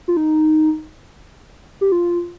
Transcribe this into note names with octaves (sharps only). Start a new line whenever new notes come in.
F4
D#4
G4
F4